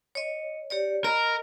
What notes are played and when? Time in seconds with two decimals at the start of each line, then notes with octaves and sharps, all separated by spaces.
0.15 C#5 D#5
0.70 G4 C#5 D5
1.04 A#4 D#5 B5